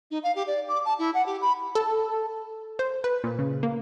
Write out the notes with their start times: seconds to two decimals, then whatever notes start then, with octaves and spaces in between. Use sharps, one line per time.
0.11 D#4
0.23 F5
0.35 G4
0.47 D5
0.68 D6
0.85 A5
0.99 E4
1.14 F#5
1.26 G4
1.41 B5
1.75 A4
2.79 C5
3.04 B4
3.24 A#2
3.39 C#3
3.63 A#3